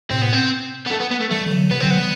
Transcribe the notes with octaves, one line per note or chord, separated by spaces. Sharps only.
A2 C3 C4
B3
C4
B3
A3
B3
B3
A3
E3 G3 A3
E3
D3 F#3
C3 E3 B3
D3 F#3 C4
B3
E3 G3